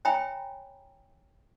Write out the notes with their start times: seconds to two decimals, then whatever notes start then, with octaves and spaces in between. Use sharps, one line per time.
0.05 C#5 E5 G5 G#5 A#5 B5